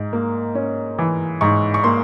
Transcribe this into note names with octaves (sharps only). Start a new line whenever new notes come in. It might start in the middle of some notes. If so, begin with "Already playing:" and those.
Already playing: G#2
A#3
C#4
E3
G#2 C#6
C#6
A#3 C6